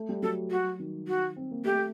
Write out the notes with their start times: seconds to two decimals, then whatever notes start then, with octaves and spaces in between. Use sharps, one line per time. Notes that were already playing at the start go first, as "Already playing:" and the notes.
Already playing: A3
0.09 G3
0.22 F#3 A4
0.51 F#4
0.80 D#3
1.08 F#4
1.36 C4
1.51 A#3
1.65 A3 G4
1.75 A3